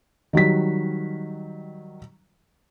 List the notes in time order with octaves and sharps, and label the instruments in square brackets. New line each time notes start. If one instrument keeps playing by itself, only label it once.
[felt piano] D#3 F#3 G3 B6